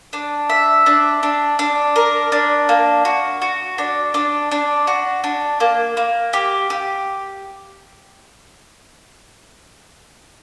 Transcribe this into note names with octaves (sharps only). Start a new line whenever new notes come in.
D4
E5
D4
D4
D4
A#4
D4
A#3
F#4
F#4
D4
D4
D4
F#4
D4
A#3
A#3
G4
G4